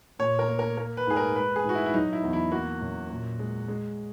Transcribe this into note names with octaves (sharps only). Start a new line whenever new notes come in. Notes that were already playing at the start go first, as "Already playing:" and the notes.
A#2 C#5
A#4
A#3
A#4
A#3 A#4
B4
G#2 G#4
A#4
G#3 B4
G#4
G#2 F#4
E4
E4
F#3 D#4
E4
E2
E4
A#3 F#4
F#2
A#2
G#3
G#3